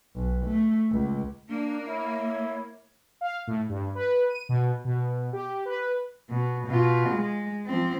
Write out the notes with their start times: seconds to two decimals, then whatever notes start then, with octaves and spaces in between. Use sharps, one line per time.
0.15 B1
0.47 A3
0.91 C#2
1.49 A#3 D4
1.88 E4 C#5
3.21 F5
3.47 A2
3.69 G2
3.95 B4
4.30 D#7
4.49 B2
4.85 B2
5.33 G4
5.65 B4
6.30 B2
6.67 B2 F4
7.09 G#3
7.66 F3 C4